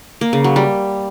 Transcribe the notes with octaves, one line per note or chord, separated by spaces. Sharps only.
A#3
C#3
F#3
G3